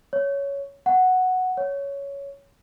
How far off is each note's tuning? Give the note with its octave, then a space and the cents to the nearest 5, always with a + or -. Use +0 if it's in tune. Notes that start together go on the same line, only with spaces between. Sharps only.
C#5 +10
F#5 +0
C#5 +10